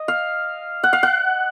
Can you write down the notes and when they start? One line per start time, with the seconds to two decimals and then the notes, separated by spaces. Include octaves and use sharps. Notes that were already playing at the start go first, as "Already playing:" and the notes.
Already playing: D#5
0.08 F5
0.83 F#5
0.93 F5
1.03 F#5